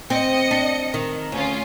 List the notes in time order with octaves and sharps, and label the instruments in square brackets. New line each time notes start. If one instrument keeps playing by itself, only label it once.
[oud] C4 [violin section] D#5 C#7
[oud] D4
D#3
[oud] D2 [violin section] C#4 F4